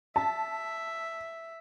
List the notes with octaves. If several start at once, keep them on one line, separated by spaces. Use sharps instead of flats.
E5 A5